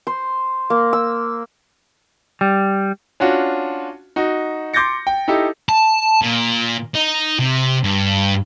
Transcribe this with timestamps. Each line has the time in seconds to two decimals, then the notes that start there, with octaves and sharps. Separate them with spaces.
0.07 C5
0.70 A#3
0.93 E6
2.41 G3
3.20 C#4 D4 F4 F#4
4.16 D#4 F#4
4.73 C6 D6 G6 A6 A#6 C#7
5.07 G5
5.28 D#4 E4 G4 A4
5.69 A5
6.22 A#2
6.95 D#4
7.39 C3
7.84 G2